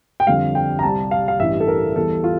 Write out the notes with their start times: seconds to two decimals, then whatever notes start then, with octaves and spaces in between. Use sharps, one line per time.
0.20 G5
0.26 F2 D3 G3 F5
0.55 G5
0.79 A#5
0.83 C2 C3 G3 A5
1.11 F5
1.28 F5
1.39 A1 G2 E3 G3 E5
1.60 A4
1.68 A#4
1.96 E2 E3 G3 A4
2.24 F4